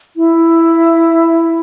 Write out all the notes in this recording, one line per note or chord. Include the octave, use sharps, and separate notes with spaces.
E4